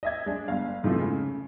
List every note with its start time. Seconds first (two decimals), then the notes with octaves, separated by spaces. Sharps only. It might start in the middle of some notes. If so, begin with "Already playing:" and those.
0.03 D#5 E5 G#6
0.26 G#3 D4
0.48 G1 F5
0.83 F2 G#2 C3 E3 F3 A3
1.01 C#3